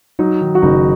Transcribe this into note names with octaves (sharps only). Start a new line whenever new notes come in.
F#3 D#4
D#3
F#4
F#1 D#4